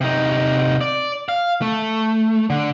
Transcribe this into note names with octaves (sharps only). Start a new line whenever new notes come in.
C3 D#4
D5
F5
A3
D3